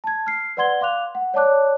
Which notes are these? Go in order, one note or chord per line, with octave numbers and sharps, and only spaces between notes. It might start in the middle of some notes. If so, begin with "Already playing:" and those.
A5 G#6
F6 C7
B4 D5 F#5 C6 G#6 G7
F5 C6 D6 F#6 F7
F#5
C#5 D5 A5 D6 F#6